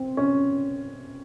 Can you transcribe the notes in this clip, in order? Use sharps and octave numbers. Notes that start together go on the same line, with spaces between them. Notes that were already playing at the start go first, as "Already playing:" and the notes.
Already playing: C4
C#4